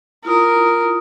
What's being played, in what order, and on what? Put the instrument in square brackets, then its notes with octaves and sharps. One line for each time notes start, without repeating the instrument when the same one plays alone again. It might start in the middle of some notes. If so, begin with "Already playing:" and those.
[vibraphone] E4 F4 D#6 [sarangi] A#4